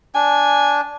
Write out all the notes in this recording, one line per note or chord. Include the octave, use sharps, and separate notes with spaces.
D4 G#5